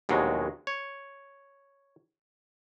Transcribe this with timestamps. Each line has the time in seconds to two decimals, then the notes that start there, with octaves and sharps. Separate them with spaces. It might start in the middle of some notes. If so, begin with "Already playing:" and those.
0.09 A#1 D#2 B2 F#3 G#3
0.67 C#5